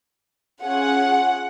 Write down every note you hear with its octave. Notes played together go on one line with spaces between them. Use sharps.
C#4 F4 G#4 F#5